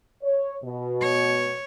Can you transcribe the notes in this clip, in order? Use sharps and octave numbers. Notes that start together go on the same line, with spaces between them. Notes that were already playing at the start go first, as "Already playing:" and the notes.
C#5
B2
C#5